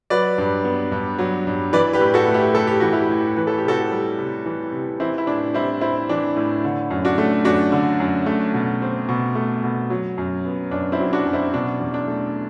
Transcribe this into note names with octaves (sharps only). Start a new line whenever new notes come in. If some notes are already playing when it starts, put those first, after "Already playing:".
F#3 B4 D5
G2
B3
G2
F#3
G2
E3 B4 D5
G4 B4
A2
F#4 A4
A3
E4 G4
A2 A4
G4
E3 F#4
E4 G4
A2
E3 B4
A4
G4
C3 F#4 A4
G3
C3
E3
C3
E3 C4 E4
E4
A2 D4
G3 C4 E4
C4 E4
E3 D4
A2
D3
F#2
D4 F#4
A3
F#2 D4 F#4
D3
F#2
A3
B2
C4
B2
A3
B2
F#3
F#2
B3
F#2 D4
C4 E4
F#3
D4 F#4
F#2
C4 E4
B2 D4
E2
D4
A3